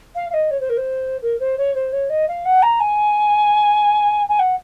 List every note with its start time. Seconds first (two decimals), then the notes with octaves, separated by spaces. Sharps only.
0.15 F5
0.30 F5
0.33 D#5
0.50 C#5
0.60 C5
0.69 A#4
0.77 C5
1.22 A#4
1.39 C5
1.57 C#5
1.74 C5
1.92 C#5
2.09 D#5
2.28 F5
2.45 F#5
2.62 A#5
2.80 G#5
4.28 G#5
4.39 F#5